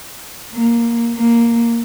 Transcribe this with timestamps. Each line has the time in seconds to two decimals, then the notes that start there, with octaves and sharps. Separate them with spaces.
0.53 A#3
1.16 A#3